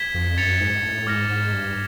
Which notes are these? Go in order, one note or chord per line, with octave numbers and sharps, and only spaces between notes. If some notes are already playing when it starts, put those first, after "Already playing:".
Already playing: G#6 B6 E7 G7
F2
F#2 A6 C#7 F7
G#2
A2
G#2 D6 F6 A#6 C#7
G#2
G2